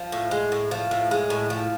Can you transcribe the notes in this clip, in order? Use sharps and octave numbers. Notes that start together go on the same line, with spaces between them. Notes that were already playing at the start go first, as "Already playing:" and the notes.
Already playing: F3
A2
G#3
A2
F3
A2
G#3
A2
F3